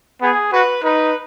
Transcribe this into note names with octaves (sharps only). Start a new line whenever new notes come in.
B3 G#4
F#4 B4
D#4 B4